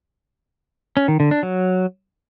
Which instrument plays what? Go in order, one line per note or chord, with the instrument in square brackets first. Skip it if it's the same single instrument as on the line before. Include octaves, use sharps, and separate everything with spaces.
[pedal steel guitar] C#4
D#3
D3
D4
F#3